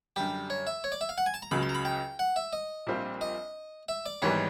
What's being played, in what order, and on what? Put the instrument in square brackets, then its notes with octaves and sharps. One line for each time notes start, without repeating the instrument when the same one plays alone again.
[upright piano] F#2 D3 G3 [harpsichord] G4
[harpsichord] C#5
E5
C#5
D5
E5
F5
F#5
G#5
A5
A#5
[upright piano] C#2 C#3 F#3 [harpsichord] B5
[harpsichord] C6
A#5
B5
G5
F#5
E5
D#5
[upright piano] A#1 A#2 G3 C4 F4
[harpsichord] D#5
E5
D5
[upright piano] G#1 G#2 E3 G3 B3 [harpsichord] C#5